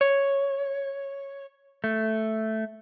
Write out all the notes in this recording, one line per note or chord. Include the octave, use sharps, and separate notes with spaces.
C#5
A3